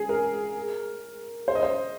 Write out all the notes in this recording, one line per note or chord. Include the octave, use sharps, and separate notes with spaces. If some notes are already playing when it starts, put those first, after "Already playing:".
Already playing: G#4
A#4
C5
D#5
C5